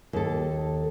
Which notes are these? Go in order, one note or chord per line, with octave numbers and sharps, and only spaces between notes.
D#2 A4